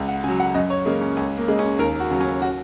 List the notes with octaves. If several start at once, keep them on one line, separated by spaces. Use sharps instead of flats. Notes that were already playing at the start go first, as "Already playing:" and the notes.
Already playing: C#2
F#5
C#3 F#3 G#5
F#5
F#2 D#5
C#5
C#3 G#3 A#3
C#4
C#2 C#4
A#3
C#3 G#3
C#4
D#2 A#4
F#4
C#3 F#3
C#4
F#4